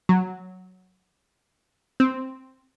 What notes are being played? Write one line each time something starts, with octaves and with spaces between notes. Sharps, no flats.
F#3
C4